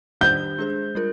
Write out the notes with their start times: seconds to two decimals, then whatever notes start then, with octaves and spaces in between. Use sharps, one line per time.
0.21 D#3 G3 D4 G4 C5 G6
0.58 G#3 D4 G#4 C5
0.95 G3 D4 F4 A#4